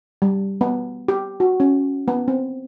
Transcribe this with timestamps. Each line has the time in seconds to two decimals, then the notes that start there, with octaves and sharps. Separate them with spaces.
0.22 G3
0.61 B3
1.08 G4
1.40 F#4
1.60 C#4
2.08 B3
2.28 C4